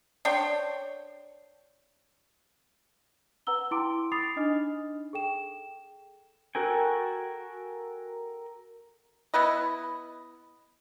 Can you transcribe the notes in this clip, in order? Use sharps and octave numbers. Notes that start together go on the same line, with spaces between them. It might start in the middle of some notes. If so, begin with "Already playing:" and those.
D4 C5 C#5 G5
B4 F#5 A#5 E6 G7
E4 G5 C6 D6 D7
B5 D6 D#6 A6 C7 F7
D4 D#4 D#5 F6
G#4 A4 G5 E7
F#4 A4 A#4 G5 G#5
B3 E4 B4 D#5